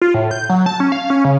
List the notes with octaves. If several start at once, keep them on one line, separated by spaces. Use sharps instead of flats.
F4
A2
G6
F#3
A5
C#4
F5
C#4
C#3